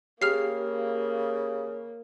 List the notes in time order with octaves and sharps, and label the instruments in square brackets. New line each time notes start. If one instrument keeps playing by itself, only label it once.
[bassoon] C#3 [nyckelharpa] A#3 [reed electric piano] G4 [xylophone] G#4 F6 C7